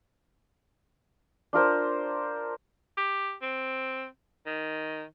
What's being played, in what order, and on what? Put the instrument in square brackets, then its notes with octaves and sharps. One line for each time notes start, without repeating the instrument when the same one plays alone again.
[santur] D4 F4 A#4 C5
[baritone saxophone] G4
C4
D#3